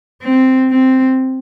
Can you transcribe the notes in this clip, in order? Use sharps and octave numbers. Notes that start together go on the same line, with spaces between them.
C4
C4